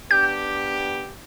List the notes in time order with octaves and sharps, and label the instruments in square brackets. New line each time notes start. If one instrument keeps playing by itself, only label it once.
[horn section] B3 D4 G4 [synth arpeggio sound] G6